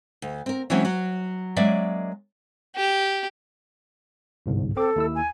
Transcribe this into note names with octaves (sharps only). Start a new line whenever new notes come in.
D2
C4 A#4
E3 F#3 G#3 C4 C#4 F#4
F#3 F#4
F#3 G#3 A#3 C#4 D5 E5
G4
G1 C2 G#2
C4 A4 D6
D#2 E4 E6
G#5